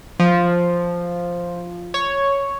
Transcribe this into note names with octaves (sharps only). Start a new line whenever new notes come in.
F3
C#5